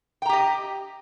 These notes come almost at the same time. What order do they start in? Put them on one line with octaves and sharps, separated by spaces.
G5 A#5 G4 D#5